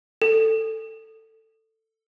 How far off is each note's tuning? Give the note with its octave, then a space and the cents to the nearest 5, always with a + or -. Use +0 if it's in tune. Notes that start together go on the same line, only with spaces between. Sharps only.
A4 +10